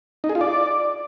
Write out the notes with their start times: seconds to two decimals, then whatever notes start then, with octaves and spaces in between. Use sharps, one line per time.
0.24 D#4
0.30 G#4
0.35 F4
0.41 D5